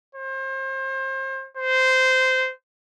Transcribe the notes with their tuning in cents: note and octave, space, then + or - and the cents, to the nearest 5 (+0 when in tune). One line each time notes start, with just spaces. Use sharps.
C5 +35
C5 -15